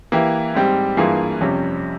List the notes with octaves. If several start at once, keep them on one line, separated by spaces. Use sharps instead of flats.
E3 A#3 E4 G4
G#2 G3 C4 G4
G2 E3 A#3 F4 G#4
F2 C3 G3 C#4